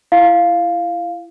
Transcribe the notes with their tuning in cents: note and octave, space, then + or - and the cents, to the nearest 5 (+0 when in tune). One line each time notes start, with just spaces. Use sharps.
E4 +25 F5 +0